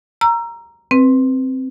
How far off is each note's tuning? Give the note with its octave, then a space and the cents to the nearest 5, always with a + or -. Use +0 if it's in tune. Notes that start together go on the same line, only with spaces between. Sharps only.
A#5 +5 E6 +30
C4 +0 B4 +0